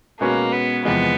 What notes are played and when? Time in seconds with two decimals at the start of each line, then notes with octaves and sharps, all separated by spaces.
0.20 B2 G#3 A#3 C#4 F#4 B4
0.53 B3
0.85 E2 C3 F3 G#3 B3